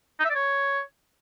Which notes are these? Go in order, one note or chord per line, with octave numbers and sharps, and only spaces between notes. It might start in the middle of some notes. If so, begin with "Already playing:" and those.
D#4
E5
D5
C#5